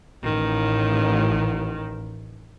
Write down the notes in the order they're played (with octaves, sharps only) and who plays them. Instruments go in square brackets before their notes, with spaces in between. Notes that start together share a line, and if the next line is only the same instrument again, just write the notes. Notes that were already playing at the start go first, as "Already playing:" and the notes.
[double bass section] A1 [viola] D#3